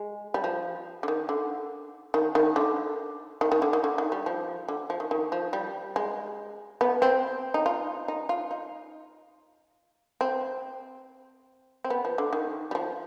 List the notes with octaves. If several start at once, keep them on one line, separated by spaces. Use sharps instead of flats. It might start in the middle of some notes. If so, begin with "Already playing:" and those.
Already playing: G#3
G3
F3
D3
D#3
D3
D#3
D#3
D3
D#3
D#3
D3
D#3
D3
D#3
G3
F3
D3
F3
D#3
D#3
F3
G3
G#3
B3
C4
D#4
F4
D#4
F4
D#4
C4
C4
B3
F3
D3
D#3
G3
F3